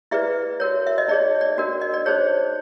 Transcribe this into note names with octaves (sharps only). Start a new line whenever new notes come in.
E4 G#4 B4 D5 E5
F#4 A#4 C#5
E5
D#5
D#4 G#4 C#5 D5
D5
D4 F#4 A#4
D#5
D5
D#4 G#4 C5 C#5